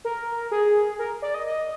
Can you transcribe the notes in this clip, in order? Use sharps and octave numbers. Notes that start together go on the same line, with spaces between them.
A#4
G#4
A#4
D5
D#5
D#5